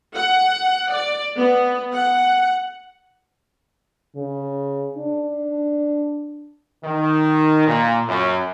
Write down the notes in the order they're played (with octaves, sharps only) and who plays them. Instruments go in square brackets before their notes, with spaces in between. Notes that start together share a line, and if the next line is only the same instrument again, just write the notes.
[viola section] F#5
D5
B3
F#5
[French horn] C#3
D4
[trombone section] D#3
A#2
F#2